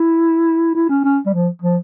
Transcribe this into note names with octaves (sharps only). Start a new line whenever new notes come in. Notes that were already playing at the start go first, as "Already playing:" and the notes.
Already playing: E4
E4
C#4
C#4
G3
F3
F3